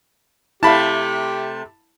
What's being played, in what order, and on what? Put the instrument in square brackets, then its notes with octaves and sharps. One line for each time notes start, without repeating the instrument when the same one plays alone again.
[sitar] C3 A3 [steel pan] E4 F5 [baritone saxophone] G4 [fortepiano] A5 B5